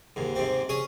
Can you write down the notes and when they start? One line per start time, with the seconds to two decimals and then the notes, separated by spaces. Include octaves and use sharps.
0.16 D#2 G#2
0.35 G#2 C3 C4
0.69 C#4 G#4 D#6